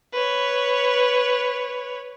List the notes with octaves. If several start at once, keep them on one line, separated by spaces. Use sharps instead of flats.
B4 C#5